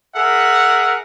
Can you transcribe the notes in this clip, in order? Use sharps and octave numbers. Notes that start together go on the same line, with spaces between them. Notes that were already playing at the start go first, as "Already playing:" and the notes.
G#4 A#4 E5 F#5